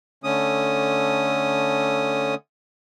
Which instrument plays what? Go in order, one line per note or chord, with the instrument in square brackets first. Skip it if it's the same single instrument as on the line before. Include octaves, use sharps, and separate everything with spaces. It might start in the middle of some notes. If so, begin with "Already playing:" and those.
[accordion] D3 A3 C#4 D#6